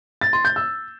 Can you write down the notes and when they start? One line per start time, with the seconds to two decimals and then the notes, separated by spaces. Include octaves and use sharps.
0.21 A6
0.33 C6
0.45 G6
0.56 E6